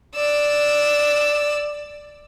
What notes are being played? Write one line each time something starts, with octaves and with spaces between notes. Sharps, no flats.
D5 E6